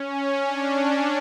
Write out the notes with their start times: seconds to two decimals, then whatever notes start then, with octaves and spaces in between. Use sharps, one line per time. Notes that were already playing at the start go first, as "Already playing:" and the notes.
Already playing: C#4
0.44 D4